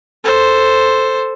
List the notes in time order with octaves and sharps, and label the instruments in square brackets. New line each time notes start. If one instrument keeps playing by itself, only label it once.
[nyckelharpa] A4 C5